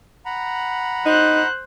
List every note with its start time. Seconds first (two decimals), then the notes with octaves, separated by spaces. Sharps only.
0.25 F#5 A#5 B5
1.06 D#4 C5 F#6